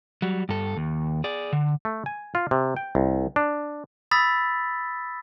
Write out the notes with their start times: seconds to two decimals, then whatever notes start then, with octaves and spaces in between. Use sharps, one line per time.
0.22 F#3 G3
0.49 G2 A4
0.77 D#2
1.24 G#4 D5
1.53 D3
1.85 A3
2.06 G#5
2.35 F4
2.51 C3
2.76 G5
2.95 C2
3.36 D4
4.11 B5 D#6 E6 A6 B6